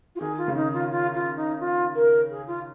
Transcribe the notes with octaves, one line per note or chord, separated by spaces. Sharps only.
F4
D#3 G#4
F4
C#3
D#3 D#4
F4
F4
F4
D#4
F4
A#4
G#4
F4